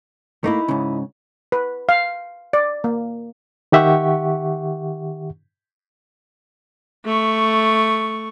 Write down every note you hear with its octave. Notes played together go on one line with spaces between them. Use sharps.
A3 A#3 D#4 E4
G#2 C#3
B4
F5
D5
A#3
D#3 G4 E5 F#5 C#6
A3 C#6